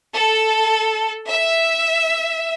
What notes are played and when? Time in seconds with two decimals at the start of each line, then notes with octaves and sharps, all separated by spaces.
0.15 A4
1.27 E5